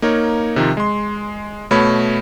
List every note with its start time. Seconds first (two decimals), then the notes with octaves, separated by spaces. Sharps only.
0.02 A#3 D#4 A#4 C#5
0.56 C3 D#3 F3
0.77 G#3 C6
1.71 B2 A3 C#5 B5